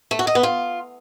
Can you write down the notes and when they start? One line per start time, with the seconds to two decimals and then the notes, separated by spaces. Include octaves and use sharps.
0.11 A3
0.19 F#4
0.27 D#5
0.35 B3
0.43 F4